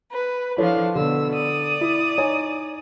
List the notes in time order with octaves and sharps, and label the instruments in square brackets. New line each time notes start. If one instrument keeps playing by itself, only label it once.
[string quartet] B4
[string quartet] F3 D4 F5 [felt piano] E4 A4 C#5
[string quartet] B2 E6 [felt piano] D3
[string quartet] D5 D#6
[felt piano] E4
D#4 C#5 G#5